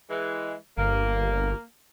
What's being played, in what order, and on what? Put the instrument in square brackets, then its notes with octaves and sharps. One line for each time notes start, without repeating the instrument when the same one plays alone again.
[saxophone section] E3 G#3
[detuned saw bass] G1 [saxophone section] A#3